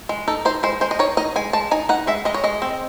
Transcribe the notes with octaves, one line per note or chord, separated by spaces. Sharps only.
G#3
D#4 A4
D#4 C5
G#3 C5
G#3 C5
D#5
D#4 C#5
D#4 D#5
G#3 G#5
G#3 A5
D#4 G#5
D#4 F#5
G#3 E5
G#3 D#5
C#5
G#3 D#5
C4